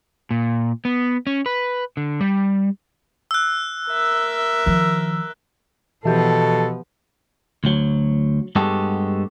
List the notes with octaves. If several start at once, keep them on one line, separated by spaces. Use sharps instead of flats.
A#2
B3
C#4
B4
D3
G3
E6 F#6
A#4 E5
D#3 F3
B2 E3 F3 B3 G4 A4
D2 F#3
G2 G#3 B3 F#4 G4 A4